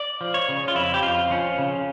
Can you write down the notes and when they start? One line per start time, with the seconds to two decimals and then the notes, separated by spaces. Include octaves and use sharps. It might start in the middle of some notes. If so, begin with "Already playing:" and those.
Already playing: D5
0.21 F3
0.34 C#5
0.49 C#3
0.68 F4
0.75 F2 E4
0.94 G4
1.03 F2 F4
1.30 F3 C#4
1.58 C#3